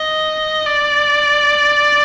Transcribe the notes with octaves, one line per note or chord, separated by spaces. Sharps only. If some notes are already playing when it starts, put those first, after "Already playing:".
Already playing: D#5
D5